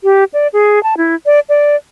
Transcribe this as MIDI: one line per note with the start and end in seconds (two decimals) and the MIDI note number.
0.04 0.24 67
0.34 0.48 74
0.53 0.82 68
0.83 0.97 81
0.97 1.15 64
1.26 1.40 74
1.49 1.76 74